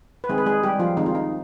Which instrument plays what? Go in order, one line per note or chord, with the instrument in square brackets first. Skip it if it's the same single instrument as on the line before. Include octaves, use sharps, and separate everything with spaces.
[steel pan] B4
D#3 G#3 C4 G#4
B4
G#3 G#4
G3 G4
F3 F4
D#3 G#3 C4 D#4
F4
D#4